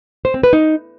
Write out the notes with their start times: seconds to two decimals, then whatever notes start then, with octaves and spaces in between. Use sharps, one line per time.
0.25 C5
0.34 C4
0.43 B4
0.53 D#4